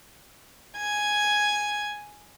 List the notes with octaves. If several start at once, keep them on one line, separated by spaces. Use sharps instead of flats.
G#5 G#6